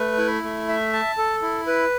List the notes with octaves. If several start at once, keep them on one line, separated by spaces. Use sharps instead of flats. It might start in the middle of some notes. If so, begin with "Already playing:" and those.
Already playing: A3 B4
E4
A3
E5
A5
A4
E4
B4